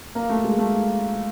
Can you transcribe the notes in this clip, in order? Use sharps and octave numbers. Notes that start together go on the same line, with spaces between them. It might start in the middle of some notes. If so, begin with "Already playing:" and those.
A#3
A3
G#3
A3